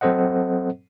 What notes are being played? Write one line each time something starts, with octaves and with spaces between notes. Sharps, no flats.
F#3 C4 A4 C5 D#5 F#5